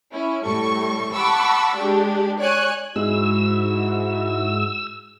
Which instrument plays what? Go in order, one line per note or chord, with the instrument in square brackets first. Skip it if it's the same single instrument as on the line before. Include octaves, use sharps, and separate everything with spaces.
[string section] C#4 E4
A2 G3 A4 C#6
F#5 A5 B5 C#6 D6 E6
G#3 D4 G4
C#5 D5 G#5 F#6
[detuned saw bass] G#2 [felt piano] G#3 [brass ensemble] E4 F#4 [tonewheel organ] E6